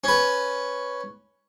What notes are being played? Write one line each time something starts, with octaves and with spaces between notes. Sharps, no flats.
C#4 B4